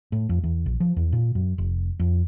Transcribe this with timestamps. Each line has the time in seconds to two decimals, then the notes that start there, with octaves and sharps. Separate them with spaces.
0.12 A2
0.29 F2
0.44 E2
0.66 A#1
0.80 F3
0.96 E2
1.12 A#2
1.35 F#2
1.58 F1
2.00 F2